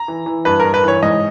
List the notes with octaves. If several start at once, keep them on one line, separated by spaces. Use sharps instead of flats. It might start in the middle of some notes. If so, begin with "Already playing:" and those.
Already playing: A#5
E3
E3
G2 B4
G2 A#4
B4
E3 C#5
G#2 D#5